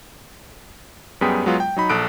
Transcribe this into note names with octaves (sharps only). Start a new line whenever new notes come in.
F#2 G3 B3 G#4 G5 B6
F#3 G#3 B3 F4
G5
F#3 D#4 B5
A#1 A4 D#6 F#6 D7